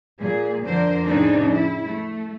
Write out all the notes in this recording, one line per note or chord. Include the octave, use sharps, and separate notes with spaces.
A#2 G#4
F2 D3 A#4 C5 D5
A2 C#3 F3 C4 D4 D#4
E4
A3